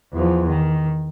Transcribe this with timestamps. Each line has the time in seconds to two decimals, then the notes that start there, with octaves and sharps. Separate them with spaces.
0.13 E2 F3
0.48 D#3